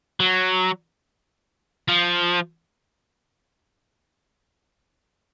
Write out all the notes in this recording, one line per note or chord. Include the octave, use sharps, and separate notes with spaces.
F#3
F3